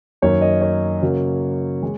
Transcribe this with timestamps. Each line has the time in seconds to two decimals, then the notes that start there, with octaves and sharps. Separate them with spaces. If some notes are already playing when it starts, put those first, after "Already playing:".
0.22 F#2 D#3 A#3 C#5
0.41 D#5
0.62 C#5
1.02 C#3 F#3 A#3
1.82 G#3